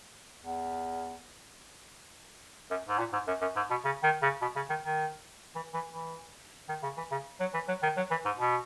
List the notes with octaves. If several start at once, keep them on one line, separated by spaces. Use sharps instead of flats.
E2
F#2
G#2
A#2
G#2
F#2
F#2
G#2
B2
C#3
D#3
C#3
B2
C#3
D#3
D#3
E3
E3
E3
D#3
C#3
E3
C#3
F#3
E3
F#3
D#3
F#3
E3
G#2
B2